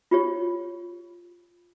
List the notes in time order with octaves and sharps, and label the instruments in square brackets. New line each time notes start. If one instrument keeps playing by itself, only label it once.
[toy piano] F4 G4 C#5